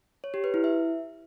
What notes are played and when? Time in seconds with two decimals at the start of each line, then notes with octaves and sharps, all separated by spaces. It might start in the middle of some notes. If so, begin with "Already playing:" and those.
0.24 C#5
0.34 G4
0.44 B4
0.54 E4
0.64 E5